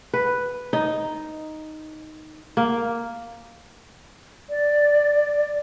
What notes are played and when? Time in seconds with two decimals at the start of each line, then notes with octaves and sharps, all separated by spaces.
0.14 B4
0.73 D#4
2.57 A#3
4.50 D5